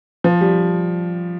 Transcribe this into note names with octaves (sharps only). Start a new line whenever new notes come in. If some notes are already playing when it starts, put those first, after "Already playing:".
F3
G3